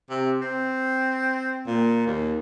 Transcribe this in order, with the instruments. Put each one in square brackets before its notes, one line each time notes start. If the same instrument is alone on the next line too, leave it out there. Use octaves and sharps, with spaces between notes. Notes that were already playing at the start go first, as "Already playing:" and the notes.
[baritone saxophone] C3
C4
A#2
D#2